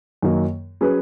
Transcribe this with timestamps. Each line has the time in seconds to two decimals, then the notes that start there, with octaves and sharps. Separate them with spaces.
0.22 F#2 D#3 F#3 A#3
0.81 F#3 C#4 G#4 B4